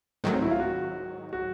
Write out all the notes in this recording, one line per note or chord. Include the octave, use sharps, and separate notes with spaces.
G#2 D#3 F#3 A3
C4
E4
F4
F#4
F#4